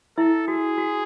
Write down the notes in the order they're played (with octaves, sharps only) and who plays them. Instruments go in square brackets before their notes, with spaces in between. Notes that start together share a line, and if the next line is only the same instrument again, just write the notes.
[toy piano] E4 E5 [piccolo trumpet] A4
[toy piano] F#4 [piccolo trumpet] G#4
[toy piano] F#4